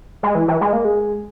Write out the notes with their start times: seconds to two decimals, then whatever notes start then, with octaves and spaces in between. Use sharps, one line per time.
0.23 G#3
0.35 E3
0.48 E3
0.61 G#3
0.73 A#3
0.85 G#3